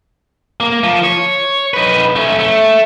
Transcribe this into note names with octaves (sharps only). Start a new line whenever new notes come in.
A#3
F3
C#5
D#4 B4
A3 C#4
A3